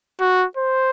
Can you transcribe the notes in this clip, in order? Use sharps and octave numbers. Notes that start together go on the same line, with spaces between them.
F#4
C5